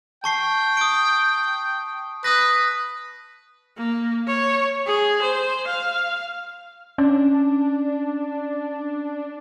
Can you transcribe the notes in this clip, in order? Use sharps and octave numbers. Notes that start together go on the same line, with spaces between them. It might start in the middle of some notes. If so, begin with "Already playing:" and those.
G5 A5 C#6 C7
D#6 D7
B4 D#6 A#6
A#3
C#5
G#4
C5
F5
C#4 D4